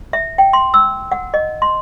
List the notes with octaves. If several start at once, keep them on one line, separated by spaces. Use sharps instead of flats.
E5
G5
C6
E6
F#5
D#5
C6